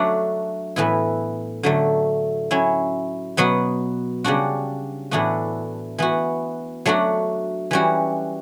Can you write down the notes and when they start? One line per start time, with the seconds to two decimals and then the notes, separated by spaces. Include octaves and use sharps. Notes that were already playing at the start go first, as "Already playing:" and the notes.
Already playing: F#3 A3 D4 F#4
0.76 A2 E3 B3 E4
1.63 D3 F#3 A3
2.51 F#3 C#4 E4
3.37 B2 F#3 B3 F#4
4.24 C#3 G3 D4 F#4
5.11 A2 E3 B3 D4 F#4
5.98 E3 B3 F#4
6.86 F#3 A3 D4 F#4
7.71 E3 G3 C#4 F#4